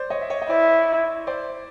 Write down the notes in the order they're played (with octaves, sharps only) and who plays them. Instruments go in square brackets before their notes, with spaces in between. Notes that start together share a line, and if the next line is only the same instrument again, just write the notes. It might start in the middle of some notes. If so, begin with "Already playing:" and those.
Already playing: [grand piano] C5 D5
C#5 D#5
E5
C#5 D#5
D#5
[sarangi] E4 [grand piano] C5 D5
[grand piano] C5 D5